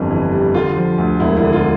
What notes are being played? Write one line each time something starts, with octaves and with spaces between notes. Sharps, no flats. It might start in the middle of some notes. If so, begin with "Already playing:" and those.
Already playing: G1 F2 E3 G3
E3
G3
D3 F4
F3
D2
E1 E4
E4
D3
F4